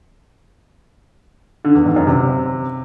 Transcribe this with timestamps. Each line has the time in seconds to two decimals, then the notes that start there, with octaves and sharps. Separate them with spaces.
1.65 D3
1.75 E2
1.86 G#2
1.96 F#2
2.07 C3